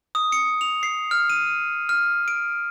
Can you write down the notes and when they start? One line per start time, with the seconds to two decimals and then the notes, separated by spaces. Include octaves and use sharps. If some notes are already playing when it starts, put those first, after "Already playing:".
0.15 D#6
0.32 C#7
0.61 F7
0.83 C7
1.11 F6
1.30 D#7
1.89 F6
2.28 D7